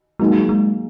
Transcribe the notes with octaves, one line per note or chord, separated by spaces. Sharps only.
F#3 G#3 A#3 D#4 G#4
G#3